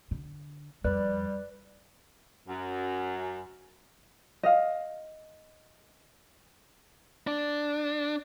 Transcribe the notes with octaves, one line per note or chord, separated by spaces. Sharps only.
D3
F2 G3 B4 D5 F#6
F#2
D#5 F5
D4